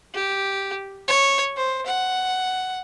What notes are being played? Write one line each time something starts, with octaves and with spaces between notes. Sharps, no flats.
G4
C#5
C5
F#5